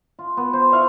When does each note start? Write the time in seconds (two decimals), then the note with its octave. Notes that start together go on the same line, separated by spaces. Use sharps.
0.19 F4
0.37 B3
0.53 C5
0.73 E4 F5 C#6